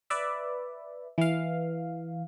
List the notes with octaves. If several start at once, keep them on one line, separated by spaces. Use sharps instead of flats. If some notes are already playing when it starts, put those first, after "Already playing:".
B4 D5 E5
E3 F5